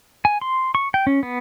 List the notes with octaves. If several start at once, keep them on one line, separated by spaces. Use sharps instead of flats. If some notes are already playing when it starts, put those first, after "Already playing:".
G#5
C6
C#6
G5
C#4
B3